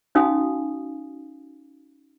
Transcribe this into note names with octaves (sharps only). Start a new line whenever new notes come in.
C#4 D#4 F#4 F5 G#5 D#6